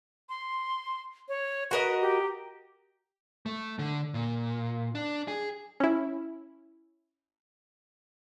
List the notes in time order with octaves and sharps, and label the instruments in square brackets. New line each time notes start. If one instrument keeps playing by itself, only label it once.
[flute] C6
C#5
[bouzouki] F#4 A#4 D#5 [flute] B4
[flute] G4
[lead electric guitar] A3
D3
A#2
D4
G#4
[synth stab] C#4 E4